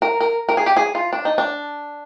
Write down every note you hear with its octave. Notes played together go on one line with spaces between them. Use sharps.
A#4
A#4
A#4
G#4
G4
G#4
F4
D4
D#4
D4